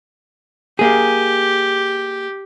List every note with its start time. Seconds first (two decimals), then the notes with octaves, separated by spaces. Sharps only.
0.79 A#3 G4 G#4